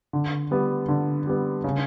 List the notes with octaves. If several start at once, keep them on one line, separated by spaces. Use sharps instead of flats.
D3
G3 B3
D3
G3 B3
C#3